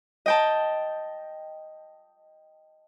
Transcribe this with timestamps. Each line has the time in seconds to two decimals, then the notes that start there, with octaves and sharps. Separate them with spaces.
0.26 D#5 G5 A5